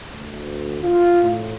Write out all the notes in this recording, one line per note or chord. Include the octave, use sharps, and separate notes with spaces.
D2
F4
A2